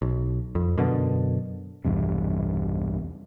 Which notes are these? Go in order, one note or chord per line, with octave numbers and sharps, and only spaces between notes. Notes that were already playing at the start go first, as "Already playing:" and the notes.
B1
F2
F#2 B2 D3
B1 E2 G2 C3